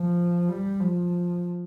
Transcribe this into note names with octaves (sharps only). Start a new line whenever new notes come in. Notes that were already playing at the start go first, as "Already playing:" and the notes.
Already playing: F3
G3
F3